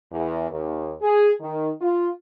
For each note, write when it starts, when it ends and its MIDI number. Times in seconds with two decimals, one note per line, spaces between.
0.11 0.49 40
0.49 0.93 39
1.01 1.31 68
1.40 1.70 51
1.80 2.09 65